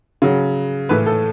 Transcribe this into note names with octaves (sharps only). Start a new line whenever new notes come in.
C#3 F#3
A2 E3 B4
A4